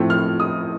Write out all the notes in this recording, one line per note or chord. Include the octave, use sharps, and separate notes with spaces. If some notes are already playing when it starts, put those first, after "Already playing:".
Already playing: A2 F3 A3 C4
F6
D#6